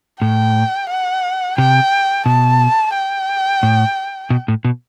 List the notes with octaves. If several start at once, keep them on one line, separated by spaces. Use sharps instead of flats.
A2 G5
F#5
C3 G5
B2 A5
G5
A2
B2
A2
B2